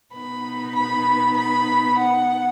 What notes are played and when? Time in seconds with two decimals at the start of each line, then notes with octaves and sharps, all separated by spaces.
0.13 B2 B3 D#4 B5
0.76 B5
1.38 B5
1.99 F#5